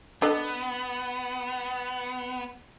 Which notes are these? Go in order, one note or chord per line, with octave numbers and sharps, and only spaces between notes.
B3 D4 A4 D#5